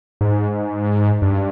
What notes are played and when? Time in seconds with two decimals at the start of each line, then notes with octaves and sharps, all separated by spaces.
0.21 G#2
1.22 G2